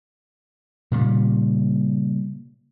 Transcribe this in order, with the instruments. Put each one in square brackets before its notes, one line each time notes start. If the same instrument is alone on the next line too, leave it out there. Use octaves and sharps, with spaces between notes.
[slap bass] A#2 C#3 G3